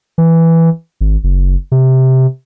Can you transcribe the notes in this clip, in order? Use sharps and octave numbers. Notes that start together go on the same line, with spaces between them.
E3
G#1
F#1
C3